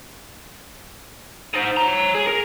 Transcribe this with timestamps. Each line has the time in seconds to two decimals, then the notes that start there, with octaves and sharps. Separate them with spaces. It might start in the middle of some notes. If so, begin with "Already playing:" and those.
1.54 D#4 C5
1.77 C#5 A#5
2.15 G#4
2.28 A#4